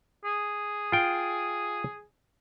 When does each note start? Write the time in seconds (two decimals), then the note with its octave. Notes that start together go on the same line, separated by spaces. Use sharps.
0.25 G#4
0.92 F4 G5